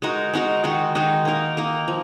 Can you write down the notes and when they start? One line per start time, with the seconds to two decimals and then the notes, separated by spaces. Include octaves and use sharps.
0.02 G#3 D#4 F#4 A#4
0.34 G#3 D#4 F#4 A#4
0.64 D#3 G#3 D#4 F#4
0.95 D#3 G#3 D#4 F#4
1.25 A#3 D#4 A#4
1.57 A#3 D#4 A#4
1.88 F3